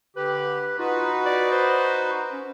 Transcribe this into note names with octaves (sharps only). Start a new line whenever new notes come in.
D3 G4 B4
D#4 F4 F#4 B4
D5
C5
C#4